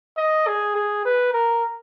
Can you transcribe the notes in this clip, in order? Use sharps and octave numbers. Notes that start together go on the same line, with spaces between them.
D#5
G#4
G#4
B4
A#4